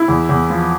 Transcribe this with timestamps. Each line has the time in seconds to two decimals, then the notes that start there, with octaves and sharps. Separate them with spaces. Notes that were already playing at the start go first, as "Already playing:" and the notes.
Already playing: E4
0.08 E2
0.29 E2
0.50 F3